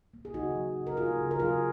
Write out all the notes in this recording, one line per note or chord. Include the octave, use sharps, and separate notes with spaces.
A#3
G#4
C#3 D#4 F#4
F#3
C#3
A#4
A#3 F4 G#4
C#3
A#4
F#3 F4 G#4